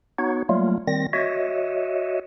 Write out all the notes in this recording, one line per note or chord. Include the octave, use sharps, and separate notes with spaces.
B3 D#4 F#4 C#5
F#3 G3 A3 A#3 F4
D#3 G3 C4 A#6
F#4 C#5 D#5 E5